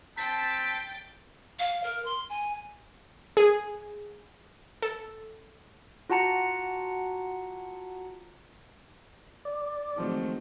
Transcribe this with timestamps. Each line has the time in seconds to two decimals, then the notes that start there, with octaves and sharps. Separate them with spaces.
0.17 C4 G5 A5 A6 B6
1.59 F5
1.83 A#4
2.05 C6
2.29 G#5
3.37 G#4
4.82 A4
6.10 F4 F#4 F#5 A5 A#5 C#7
9.45 D5
9.96 D#3 F3 F#3 G#3 A3 C4